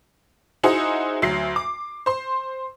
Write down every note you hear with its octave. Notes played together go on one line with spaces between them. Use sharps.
D#4 E4 F#4 G#4 C5 D#5
D2 F#3 C7
D6
C5 C6